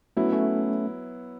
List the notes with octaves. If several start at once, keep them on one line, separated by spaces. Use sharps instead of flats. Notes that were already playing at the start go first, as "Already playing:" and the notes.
F#3 A3 B3 C#4 E4
A3 C#4